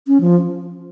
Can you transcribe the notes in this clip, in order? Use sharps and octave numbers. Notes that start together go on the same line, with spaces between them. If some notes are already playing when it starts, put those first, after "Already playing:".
C#4
F3